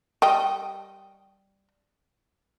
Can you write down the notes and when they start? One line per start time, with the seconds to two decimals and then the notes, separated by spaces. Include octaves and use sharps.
0.22 G3 D#5 G5